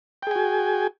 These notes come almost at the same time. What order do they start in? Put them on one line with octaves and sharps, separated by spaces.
G5 G#4 G#5 F#4